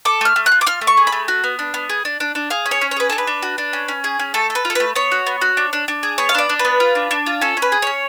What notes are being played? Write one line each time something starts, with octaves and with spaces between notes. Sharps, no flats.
A4 D6
A3 F6
A3
F#6
F4
D6
F4 F6
A3
C#6
G#4
B5
A3
F#4
B3
D4
B3
G#4
D4
D4
D4
G#4 F5
C#4
C#5
C#4
C#5
G#4 B4
D4 A4
B4
D4
F#4
D4
C#4
C#4
G#4
C#4
A3 A4
A4
B4
F4
A4
A3 B4
B3 C#5
F#4
B3
F#4
D4
D4
D4
G#4
B3 C#5
F5
D4 D5
D4
B4
B3
F4
D4
D4
F4
C#4 A4
C#4
B4
G#4
C#4 C#5